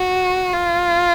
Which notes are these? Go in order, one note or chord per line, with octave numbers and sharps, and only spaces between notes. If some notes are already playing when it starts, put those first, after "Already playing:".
Already playing: F#4
F4